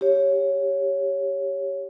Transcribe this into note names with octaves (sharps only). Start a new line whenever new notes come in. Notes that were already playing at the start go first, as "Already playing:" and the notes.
G4 C#5